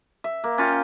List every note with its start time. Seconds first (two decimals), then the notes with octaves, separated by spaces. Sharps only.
0.24 E5
0.44 A#3
0.58 C#4 F4 G5